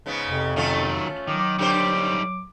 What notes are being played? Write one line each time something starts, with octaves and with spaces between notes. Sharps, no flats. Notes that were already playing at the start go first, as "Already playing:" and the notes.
G#2 C#3 B3
F2 C3
D#3 F#3 A3 C#4 F4
D#3 F#3 D6
D3 D#3 G3 G4 C5